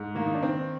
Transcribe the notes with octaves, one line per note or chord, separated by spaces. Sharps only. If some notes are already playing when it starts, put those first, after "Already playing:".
Already playing: G#2
D#3 A#3
D#4
D4
D#3 C4